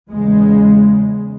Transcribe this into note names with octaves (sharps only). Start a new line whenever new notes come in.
E2 C#3 G#3